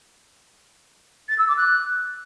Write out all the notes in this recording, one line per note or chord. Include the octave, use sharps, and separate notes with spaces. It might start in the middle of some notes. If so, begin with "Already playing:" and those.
A6
E6
D6
F#6